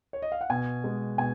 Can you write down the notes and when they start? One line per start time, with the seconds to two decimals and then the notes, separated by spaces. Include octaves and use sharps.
0.13 C#5
0.22 D#5
0.32 F5
0.41 F#5
0.50 B2 G#5
0.84 G#3
1.18 B2 G#5